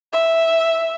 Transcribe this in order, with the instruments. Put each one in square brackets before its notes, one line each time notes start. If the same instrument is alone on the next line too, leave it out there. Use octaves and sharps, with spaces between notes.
[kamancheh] E5